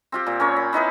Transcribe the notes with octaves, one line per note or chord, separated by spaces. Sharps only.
C4 F4 G4
A#2
C#4 A#4 C#5
B5
B3 D#4 E4 B4